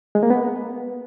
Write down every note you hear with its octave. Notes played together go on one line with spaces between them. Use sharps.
G#3
A#3
B3